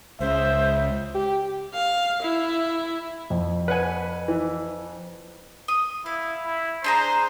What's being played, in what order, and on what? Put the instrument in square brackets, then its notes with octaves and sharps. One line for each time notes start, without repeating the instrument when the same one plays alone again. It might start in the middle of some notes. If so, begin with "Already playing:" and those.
[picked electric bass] C#2 [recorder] C5 [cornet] E5
[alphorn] G4
[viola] F5
E4
[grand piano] F2
[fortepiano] B4 F#5 G#5
E3
[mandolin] D#6
[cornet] E4 [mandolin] F5
[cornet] E4
[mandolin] D4 G#4 A#5 [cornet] C5